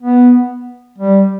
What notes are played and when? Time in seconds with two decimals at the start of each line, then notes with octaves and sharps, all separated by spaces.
0.01 B3
0.98 G3